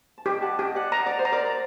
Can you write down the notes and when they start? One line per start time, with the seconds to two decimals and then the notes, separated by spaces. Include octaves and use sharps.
0.18 A5
0.25 G4 D#5 G5
0.42 F#5 A5
0.59 G4 D#5 G5
0.75 D5 F#5
0.92 D#5 A#5
1.06 D5
1.19 C5
1.25 A#5
1.32 A#4 D5